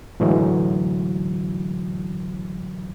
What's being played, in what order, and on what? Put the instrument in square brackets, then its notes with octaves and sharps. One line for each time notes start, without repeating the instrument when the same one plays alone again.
[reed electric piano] A2 D3 E3 F#3 G#3